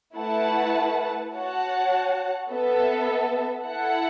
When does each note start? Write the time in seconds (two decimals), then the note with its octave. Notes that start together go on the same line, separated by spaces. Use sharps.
0.17 A3 E4 B4 F#5 A5
1.34 F#4 C#5 F#5 A5
2.50 B3 A4 E5
3.67 E4 A4 F#5